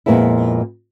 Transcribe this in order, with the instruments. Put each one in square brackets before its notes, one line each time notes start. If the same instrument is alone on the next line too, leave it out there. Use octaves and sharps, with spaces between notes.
[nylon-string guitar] F2 A#2 G#3 B3 E4